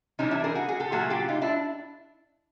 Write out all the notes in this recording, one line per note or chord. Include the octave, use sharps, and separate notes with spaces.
C3 E3 G3 C#4 D#4
D4 E4
G#4 A#4
F#4 G#4
F#4 G#4
G4 A4
A#2 F#3 A3 F#4 G#4
F4 G4
D#4 F4
D4 E4